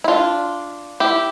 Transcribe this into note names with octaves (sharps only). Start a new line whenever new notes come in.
E4
D4 F4
E4 G4